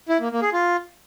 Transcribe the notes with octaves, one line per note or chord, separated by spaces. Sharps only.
E4
A#3
A#3
G#4
F4